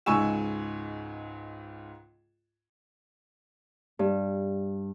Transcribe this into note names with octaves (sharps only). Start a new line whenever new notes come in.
C#2 G#2 G#5 C#6 E6 E7
G2